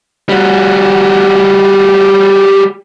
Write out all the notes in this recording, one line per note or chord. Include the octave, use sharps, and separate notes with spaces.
G3 F#4